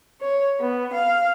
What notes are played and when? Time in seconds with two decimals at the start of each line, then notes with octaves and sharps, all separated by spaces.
0.20 C#5
0.60 B3
0.92 F5